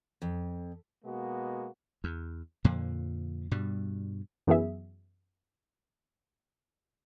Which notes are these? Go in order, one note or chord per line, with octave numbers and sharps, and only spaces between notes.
F2
B2 G#3 A#3 B3 F#4
E2
F2 A#2 D3 F3
G2 B2 G3
F#2 E3 B3 G#4 E5